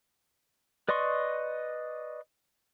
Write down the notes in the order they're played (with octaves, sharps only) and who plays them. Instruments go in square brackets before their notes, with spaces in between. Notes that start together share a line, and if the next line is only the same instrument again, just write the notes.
[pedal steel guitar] B4 D5 D#5 C6 C#6